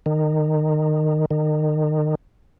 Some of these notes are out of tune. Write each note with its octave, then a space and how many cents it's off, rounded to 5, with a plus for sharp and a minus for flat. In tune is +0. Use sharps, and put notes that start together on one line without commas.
D#3 -20
D#3 -30